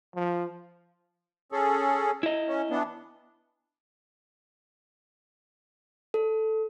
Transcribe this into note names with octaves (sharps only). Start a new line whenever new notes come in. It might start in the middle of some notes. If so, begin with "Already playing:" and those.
F3
C#4 G#4 A4
E4 D#5
C#4
E3 B3 D4
A4